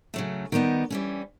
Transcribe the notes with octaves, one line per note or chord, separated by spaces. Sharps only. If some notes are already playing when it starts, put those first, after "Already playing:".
C#3 F#3 A3
D#3 G3 B3 D#4
E3 G3 A#3 C#4